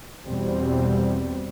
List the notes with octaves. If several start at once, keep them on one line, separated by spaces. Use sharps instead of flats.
E2 B2 G3 C4